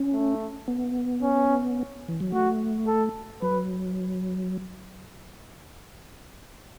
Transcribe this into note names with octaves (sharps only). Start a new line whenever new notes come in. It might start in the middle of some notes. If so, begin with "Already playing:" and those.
Already playing: C#4
A3
B3
C#4
E3
F#3
A3 F#4
A4
F#3 B4